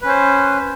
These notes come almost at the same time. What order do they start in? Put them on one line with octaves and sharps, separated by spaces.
B4 C#4 C5